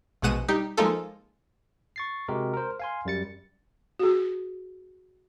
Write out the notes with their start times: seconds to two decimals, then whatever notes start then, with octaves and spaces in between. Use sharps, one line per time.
0.22 A#1 B2 G#3 F#5 D#7 E7
0.48 G3 D#4 G4
0.77 F3 G#3 A#3 D#4 F4 A4
1.96 C#6 A6 C7
2.28 C3 G#3 F#4 G4 A#4
2.54 A#4 C5
2.80 F5 G#5 C6
3.05 F#2 G3 A6 C#7
3.99 F#4 G#4